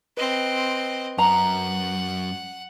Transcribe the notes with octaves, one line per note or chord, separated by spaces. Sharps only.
C4 B4 D#5
F#2 F#5 A#5